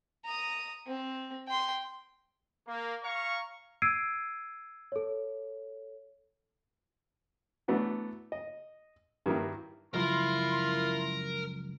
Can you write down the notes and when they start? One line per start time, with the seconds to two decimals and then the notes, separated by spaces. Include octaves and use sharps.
0.25 A#5 D#6
0.87 C4
1.48 G5 C6
2.68 A#3
3.04 C#5 F5 A#5 C#6
3.82 E6 G#6 C7 D7 D#7
4.92 A4 C#5
7.68 E3 F#3 A3 B3 D4 F#4
8.32 D#5
9.26 G2 D#3 F#3 A#3 E4
9.95 C#2 F#2 F3 E4 F4 A#4 B5 C6